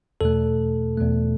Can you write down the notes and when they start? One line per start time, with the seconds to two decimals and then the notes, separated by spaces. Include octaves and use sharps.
0.21 E2 B2 A3 A4
0.98 E2 B2 A3